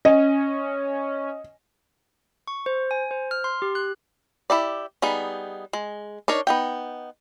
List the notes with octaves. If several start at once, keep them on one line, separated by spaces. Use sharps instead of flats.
C#4 D#5
C#6
C5
G#5
C5
F6
C6
G4
F#6
E4 G4 D5
G3 B3 D#4 G#4
G#3
D4 D#4 A#4 C#5
B3 D#4 G5